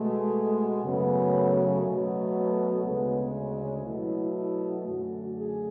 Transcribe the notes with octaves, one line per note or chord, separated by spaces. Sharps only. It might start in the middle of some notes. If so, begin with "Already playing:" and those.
Already playing: B2 G#3 A3
F#2 C#3 F#3 A3 B3
B2 F#3 A3
B3
D2 C#3 G#3 B3
B2 F#3 A3 E4
E4
F#2 D3 A3 F#4
G#4